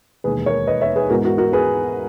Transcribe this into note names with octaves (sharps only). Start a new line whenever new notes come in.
E1 D#2 D#3 G#4 B4
A#4 C#5
B4 D#5
C#5 E5
G#4 B4
G#2 E3 B3 F#4 A#4
F#4 A#4
F#4 A#4
G#4 B4